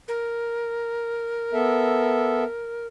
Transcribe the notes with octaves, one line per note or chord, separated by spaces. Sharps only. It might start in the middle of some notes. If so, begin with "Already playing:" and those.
A#4
B3 A4 E5